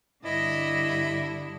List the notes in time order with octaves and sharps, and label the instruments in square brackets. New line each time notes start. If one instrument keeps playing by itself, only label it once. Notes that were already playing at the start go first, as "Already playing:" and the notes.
[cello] G2 D3 [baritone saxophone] E4 [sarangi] D#5